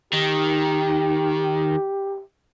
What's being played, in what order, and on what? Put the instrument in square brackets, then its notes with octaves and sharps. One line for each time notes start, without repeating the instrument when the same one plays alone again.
[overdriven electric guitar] D#3 [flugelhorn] G4